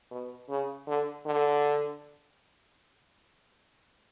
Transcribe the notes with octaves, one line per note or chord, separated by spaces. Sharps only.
B2
C#3
D3
D3